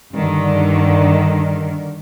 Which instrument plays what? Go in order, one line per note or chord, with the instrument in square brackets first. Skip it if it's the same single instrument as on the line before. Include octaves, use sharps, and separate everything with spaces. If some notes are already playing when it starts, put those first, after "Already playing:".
[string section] G2 D3 D#3